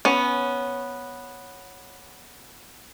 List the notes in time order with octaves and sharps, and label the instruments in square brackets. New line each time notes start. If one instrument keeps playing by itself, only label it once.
[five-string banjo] B3 C#4